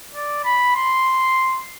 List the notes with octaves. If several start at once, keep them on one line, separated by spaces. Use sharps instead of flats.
D5
B5
C6